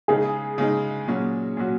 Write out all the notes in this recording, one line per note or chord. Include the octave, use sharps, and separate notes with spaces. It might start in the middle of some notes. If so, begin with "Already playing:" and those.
C#3 G#3 D#4 G#4
C#3 G#3 D#4
A#2 F#3 C#4 F#4
A#2 F#3 C#4 F#4